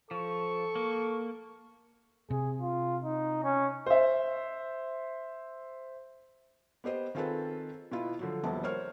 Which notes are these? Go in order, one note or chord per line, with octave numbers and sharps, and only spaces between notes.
F3 A4 C#6
A#3
C3 G#4
F4
D#4
C#4
C5 E5
B3 G4 C5 D#5
D#3 C4 F4 G#4 A4 B4
B2 B3 E4 F4
D3 F3 F#3
D#1 A#1 B3 A5
A#4 C5 C#5 F6